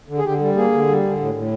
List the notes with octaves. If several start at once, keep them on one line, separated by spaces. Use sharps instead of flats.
D3
G#4
D3 G4
G3
A#3 G#4
D3
G3
D3
A2
A2